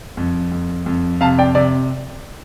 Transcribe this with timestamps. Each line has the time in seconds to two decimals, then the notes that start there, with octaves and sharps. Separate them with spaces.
0.17 F2
0.52 F2
0.86 F2
1.21 C3 F5 A5
1.38 D5 G5
1.55 C3 D5